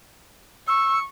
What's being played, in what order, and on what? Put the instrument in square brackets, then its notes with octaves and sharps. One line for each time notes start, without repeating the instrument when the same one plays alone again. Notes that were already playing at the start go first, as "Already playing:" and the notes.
[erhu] C#6 [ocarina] E6